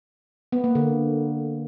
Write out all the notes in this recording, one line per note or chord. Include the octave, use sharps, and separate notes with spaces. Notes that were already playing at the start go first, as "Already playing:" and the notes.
B3
A#3
D3